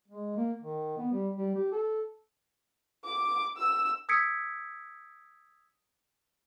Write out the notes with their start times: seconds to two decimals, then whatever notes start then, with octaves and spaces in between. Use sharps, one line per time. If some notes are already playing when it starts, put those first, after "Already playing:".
0.08 G#3
0.37 A#3
0.62 D#3
0.98 B3
1.12 G3
1.36 G3
1.55 G4
1.72 A4
3.05 D6
3.57 E6
4.09 D#6 E6 G#6 B6 C#7 D7